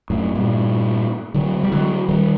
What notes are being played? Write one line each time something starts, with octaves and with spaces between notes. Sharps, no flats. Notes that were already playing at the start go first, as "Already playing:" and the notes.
F#2 A2
G2 A#2
D3 F#3
G3
D3 F#3
D#3 G3